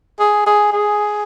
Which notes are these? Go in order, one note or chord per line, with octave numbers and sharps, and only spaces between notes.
G#4
G#4
G#4